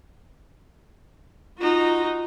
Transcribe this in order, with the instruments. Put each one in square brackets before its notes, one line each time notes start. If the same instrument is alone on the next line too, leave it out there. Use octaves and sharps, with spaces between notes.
[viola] D#4 F#4 [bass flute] F4